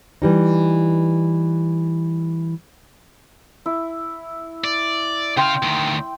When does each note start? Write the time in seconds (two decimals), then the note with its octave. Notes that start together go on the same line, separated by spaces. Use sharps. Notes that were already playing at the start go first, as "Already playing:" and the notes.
0.22 E3 G3 D#4
3.66 E4
4.64 D5
5.37 C#3 F5 G5 C6
5.63 D2 D#3